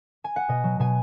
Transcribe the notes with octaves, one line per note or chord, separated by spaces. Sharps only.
G#5
F#5
B2 D#5
F#3
B2 G#5